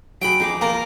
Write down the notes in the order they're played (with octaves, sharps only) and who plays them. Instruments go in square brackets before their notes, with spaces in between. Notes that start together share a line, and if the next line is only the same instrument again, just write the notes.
[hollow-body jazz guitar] F#3 G#4 [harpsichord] G5 B5
[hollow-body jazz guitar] F2 G#4 [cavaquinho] D#4 D6
[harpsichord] A#3 [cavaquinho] F4 A#4